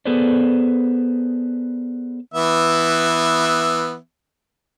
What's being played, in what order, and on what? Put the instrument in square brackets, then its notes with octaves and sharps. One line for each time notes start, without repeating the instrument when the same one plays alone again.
[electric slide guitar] B3 G#4 A4 B4 C5 D5
[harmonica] E3 B3 E5